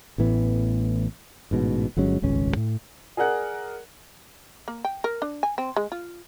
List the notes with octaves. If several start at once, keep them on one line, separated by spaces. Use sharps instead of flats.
A1 A2 E3 B3
A1 G#2 B2
G1 F#3 G#3 C#4
D#1 G#1 C#2 C#4
A2
G#4 A#4 D5 F#5 F#6
A#3
G5
A#4
D4
G#5
C4
G#3
F4